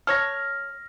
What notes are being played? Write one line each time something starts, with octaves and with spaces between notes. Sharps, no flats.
A4 C#5 F6 A#6